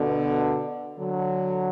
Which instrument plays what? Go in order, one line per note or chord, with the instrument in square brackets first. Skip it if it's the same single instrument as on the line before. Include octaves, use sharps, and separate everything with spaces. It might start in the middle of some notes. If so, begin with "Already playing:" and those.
Already playing: [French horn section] B2 D3
D3 F#3